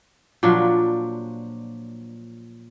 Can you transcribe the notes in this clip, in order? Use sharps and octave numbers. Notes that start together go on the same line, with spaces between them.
A#2 F3 F#3 D4